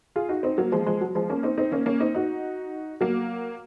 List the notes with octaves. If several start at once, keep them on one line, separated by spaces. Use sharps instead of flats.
F4 G#4
D#4 F#4
C4 D#4
F#3 A#3
F3 G#3
F3 G#3
F#3
F3 G#3
A#3 C#4
C4 D#4
C4 D#4
A#3 C#4
A#3 C#4
C4 D#4
D#4 F#4
F#3 A#3